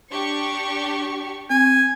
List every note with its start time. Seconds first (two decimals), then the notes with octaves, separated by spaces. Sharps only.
0.11 D4 G4 C#6
1.50 C4 G#5